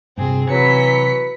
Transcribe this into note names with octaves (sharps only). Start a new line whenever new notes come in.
G2 C3 C4 G#4
C3 E3 F#3 B4 B6 C#7